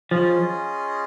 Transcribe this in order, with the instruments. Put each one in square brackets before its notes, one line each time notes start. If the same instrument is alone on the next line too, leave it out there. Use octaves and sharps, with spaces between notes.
[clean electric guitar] F3 [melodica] C#4 F4 G#4 D#5